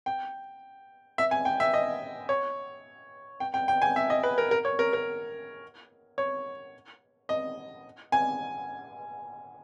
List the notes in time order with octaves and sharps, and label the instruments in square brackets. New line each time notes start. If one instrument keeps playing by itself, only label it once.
[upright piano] G5
E5
G#5
G5
E5
D#5
C#5
G5
G5
G5
G#5
E5
D#5
B4
A#4
A#4
C#5
A#4
A#4
C#5
D#5
G#5